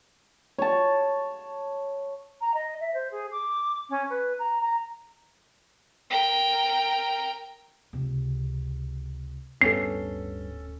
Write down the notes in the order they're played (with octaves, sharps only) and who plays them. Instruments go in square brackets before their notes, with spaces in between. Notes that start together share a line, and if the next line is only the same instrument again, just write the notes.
[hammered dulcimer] C#5 A5
[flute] A#5
D#5
E5
C5
G#4
D6
C#4
B4
A#5
A#5
[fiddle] A#4 G5
[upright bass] C#2 C3
[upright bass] D1 [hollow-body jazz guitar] G2 B3 [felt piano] C#4 A4 [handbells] C7